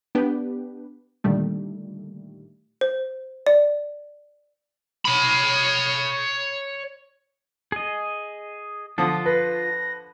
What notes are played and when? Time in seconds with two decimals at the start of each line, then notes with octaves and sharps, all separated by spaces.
0.15 B3 D4 G4 B4
1.24 A#2 D3 D#3 G3 A3
2.81 C5
3.47 D5
5.05 C#5 B5
7.72 G#4 D#5
8.98 D3 F3 F4 D#6
9.26 B4 A#6